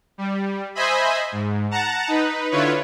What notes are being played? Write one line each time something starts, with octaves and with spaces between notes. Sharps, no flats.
G3
C5 D#5 E5 G#5 B5
G#2
F#5 A5 A#5
D#4 B4
D3 E4 F4 B4 C#5